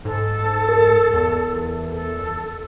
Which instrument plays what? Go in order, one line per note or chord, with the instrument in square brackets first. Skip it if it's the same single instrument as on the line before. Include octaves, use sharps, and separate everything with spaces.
[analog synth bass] G#2 [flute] A4
[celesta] A#4
[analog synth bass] E2
[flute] A4